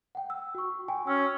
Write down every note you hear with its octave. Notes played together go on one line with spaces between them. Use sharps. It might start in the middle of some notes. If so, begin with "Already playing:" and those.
F#5 G5
E6
F#4 C#6
F#4 G5 G#5
C#4 E6